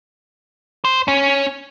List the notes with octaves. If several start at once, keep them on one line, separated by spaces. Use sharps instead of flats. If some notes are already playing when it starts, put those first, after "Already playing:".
C5
C#4